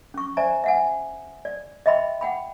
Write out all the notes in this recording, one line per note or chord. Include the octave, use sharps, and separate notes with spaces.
C#4 C#6
C5 D5 E5 G#5 A#5
E5 F#5 G#5
D5
D#5 E5 G5 B5 C6
F#5 G5 B5